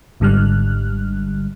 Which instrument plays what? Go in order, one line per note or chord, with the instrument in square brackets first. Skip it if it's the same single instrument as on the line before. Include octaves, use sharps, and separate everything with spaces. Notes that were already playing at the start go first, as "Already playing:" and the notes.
[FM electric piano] G#1 G#2 D3 G3 F6 F#6